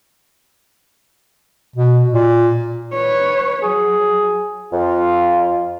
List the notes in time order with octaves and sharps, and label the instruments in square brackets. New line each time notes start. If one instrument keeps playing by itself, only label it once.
[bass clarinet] B2
A#2
[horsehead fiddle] B4 C#5
[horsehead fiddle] F#3 [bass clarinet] G#4
[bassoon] F2 [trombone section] F4